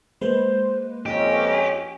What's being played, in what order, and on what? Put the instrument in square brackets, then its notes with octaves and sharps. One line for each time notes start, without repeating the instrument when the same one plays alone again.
[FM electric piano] G#3 A#3 B4 [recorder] C5
[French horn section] F2 C#4 [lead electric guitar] G4 [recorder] D#5